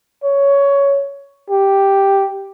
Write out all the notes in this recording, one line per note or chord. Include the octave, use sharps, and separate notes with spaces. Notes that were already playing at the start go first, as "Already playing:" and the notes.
C#5
G4